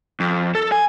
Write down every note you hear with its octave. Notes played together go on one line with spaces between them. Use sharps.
F2
A4
G#5